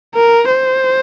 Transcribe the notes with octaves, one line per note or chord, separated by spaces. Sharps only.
A#4
C5